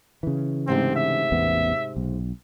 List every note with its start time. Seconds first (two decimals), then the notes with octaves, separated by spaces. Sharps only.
0.23 C#3 E3
0.67 G#2 C3 A3 C4
0.96 E5
1.32 A1 E2 B3
1.96 B1